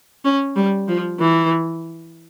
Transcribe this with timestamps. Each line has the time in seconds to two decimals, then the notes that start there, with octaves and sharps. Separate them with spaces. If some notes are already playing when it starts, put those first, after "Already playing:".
0.25 C#4
0.56 G3
0.88 F3
1.20 E3